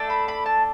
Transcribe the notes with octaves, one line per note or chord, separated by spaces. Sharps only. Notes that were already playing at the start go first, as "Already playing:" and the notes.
Already playing: A3 D4 A4
B5
B5
A5